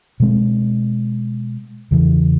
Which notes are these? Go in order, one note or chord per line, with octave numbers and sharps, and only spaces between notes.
B2 G#3 C4
E2 C#3 E3